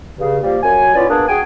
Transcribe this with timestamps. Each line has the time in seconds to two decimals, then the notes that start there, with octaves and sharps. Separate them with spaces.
0.18 G2 C#3
0.43 F3 G3 A#3
0.63 F#2 G#5
0.95 B3 C#4 E4 F4 D5
1.09 A#3 B3 D4 G#4
1.28 F#4 G#4 G5 G#5